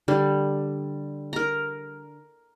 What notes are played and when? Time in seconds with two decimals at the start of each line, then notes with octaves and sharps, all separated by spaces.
0.08 D3 G3
1.33 A#4 A#5